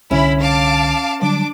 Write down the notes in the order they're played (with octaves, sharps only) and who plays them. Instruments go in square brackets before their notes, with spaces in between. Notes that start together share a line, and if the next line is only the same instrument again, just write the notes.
[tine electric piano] C2 D3 [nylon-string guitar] C#4 [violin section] E4 B5
[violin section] F5 A5 D6
[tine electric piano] D3 F#3 G3 [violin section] D4 D6